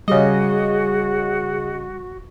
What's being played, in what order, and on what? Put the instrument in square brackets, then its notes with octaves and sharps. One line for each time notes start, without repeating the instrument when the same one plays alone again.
[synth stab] C#3 D#5 [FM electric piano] G3 [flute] F#4 [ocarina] G#4